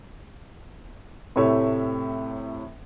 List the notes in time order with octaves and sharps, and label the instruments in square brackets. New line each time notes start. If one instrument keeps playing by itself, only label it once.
[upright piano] A2 C3 A3 C#5 E5